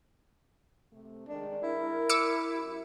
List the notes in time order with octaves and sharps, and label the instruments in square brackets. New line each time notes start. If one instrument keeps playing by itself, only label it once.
[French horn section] C3 A3
[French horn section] D#3 G#3 [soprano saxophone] D4
[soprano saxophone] E4 [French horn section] A#4
[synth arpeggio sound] D6 E6 C#7
[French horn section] F#2 F#4 G4